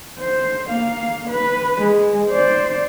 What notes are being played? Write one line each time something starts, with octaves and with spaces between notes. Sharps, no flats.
C5
A#3 F5
B4
G#3
C5 D5